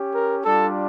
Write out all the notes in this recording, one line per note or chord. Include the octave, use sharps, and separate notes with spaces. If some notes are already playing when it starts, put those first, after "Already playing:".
Already playing: C#4 G4
A#4
G3 D4 F4 A4